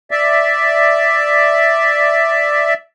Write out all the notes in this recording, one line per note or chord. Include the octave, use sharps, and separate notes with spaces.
D5 E5